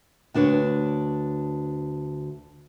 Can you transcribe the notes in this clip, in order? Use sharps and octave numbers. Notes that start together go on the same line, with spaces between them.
D2 D4 B4 C#5